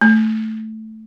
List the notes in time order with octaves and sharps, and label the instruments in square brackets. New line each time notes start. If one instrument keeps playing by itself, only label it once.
[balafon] A3